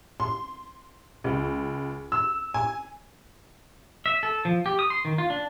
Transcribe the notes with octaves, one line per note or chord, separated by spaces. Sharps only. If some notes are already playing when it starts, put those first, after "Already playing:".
C6
C#2
E6
G#5
E5
A4
F3
G4
D#6
C6
D#3
F4
D4